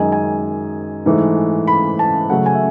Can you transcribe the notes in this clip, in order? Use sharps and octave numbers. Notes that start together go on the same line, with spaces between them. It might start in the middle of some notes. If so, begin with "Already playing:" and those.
Already playing: F#2 D#3 G#3 D#4 G#5
G#5
G#2 E3 A3
B5
A5
C#3 F#3 A3 F#5
G#5
E5